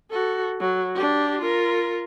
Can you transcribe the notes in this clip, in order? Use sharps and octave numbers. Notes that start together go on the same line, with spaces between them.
F#4 A4
F#3
D4 G4
F4 A#4